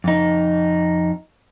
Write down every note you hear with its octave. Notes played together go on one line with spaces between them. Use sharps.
F2 D#4